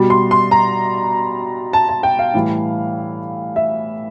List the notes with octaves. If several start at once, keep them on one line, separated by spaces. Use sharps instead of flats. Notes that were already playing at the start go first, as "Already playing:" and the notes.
Already playing: B2 G3
C6
C6
A#5
A5
A5
G5
F5
A2 E3 G3
E5